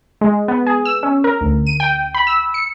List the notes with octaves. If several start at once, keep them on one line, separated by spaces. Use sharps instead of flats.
G#3
B3
G#4
E6
C#4
A#4
D2
D#7
G5
B5
E6
C#7